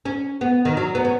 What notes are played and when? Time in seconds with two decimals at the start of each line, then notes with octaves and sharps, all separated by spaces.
0.05 C#4
0.41 B3
0.65 D#3
0.77 F#3
0.95 B3
1.05 C#4